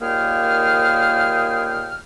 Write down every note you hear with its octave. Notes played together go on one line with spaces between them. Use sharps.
D#2 A#2 A#3 G#4 G5 F6